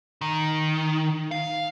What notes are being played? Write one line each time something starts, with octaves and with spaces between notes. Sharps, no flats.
D#3
F5